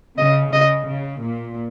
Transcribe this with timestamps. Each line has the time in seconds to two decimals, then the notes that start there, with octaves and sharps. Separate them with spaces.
0.17 C#3 D#5
0.53 C#3 D#5
0.87 C#3
1.21 A#2